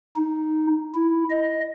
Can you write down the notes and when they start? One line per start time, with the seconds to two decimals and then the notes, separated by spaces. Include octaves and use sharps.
0.16 D#4
0.95 E4
1.30 D#5